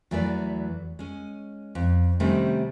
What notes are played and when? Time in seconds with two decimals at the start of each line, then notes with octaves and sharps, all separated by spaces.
0.11 E2 E3 F#3 A3 B4 D5
0.99 G#3 C#4
1.75 F2
2.20 C3 D#3 G3 A3 C#4 D#4